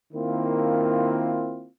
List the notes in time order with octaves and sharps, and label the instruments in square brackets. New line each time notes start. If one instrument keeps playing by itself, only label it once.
[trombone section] D#3 A#3 C4 E4 F4